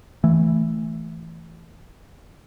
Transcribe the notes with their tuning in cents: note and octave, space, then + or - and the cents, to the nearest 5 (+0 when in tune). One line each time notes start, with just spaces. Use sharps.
E3 +0 A3 +0